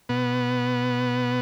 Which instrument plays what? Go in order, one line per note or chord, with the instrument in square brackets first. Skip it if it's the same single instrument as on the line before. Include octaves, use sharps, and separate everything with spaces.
[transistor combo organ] B2 B3